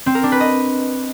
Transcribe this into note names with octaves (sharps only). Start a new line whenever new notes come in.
C4
A#4
D4
B4
D#5